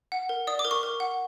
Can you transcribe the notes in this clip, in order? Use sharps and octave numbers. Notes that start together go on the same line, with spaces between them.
F#5
A#4
D5 D#6
D6
A#4
C#6
A#4
F#5